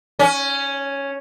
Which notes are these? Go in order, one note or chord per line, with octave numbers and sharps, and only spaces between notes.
C#4